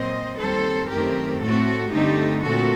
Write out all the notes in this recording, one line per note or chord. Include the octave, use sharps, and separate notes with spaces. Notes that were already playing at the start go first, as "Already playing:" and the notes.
Already playing: A#2 F#3 C4 C5 D#5
D#2 D#3 G3 C4 A4 C5
F#2 D#3 A3 C4 G4 A#4
A2 A3 C4 F#4 A4
G2 D3 A3 C4 D#4 G4
A#2 A3 C4 F#4 A4